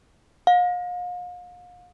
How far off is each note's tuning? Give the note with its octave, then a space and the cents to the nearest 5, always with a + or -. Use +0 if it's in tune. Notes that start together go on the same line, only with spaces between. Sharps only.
F5 +40